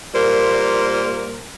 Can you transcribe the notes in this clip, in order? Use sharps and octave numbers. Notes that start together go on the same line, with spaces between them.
A#2 G3 A#3 A#4 C5